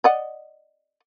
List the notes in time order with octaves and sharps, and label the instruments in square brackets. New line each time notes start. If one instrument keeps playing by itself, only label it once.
[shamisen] D5 D#5 F#5